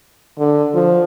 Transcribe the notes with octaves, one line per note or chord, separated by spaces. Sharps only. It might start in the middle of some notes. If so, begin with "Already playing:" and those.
D3
F3